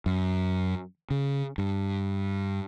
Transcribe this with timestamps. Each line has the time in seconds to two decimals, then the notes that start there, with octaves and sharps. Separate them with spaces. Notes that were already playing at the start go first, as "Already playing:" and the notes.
0.06 F#2
1.10 C#3
1.58 G2